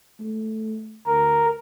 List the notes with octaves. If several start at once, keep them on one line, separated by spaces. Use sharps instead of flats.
A3
D2 A#4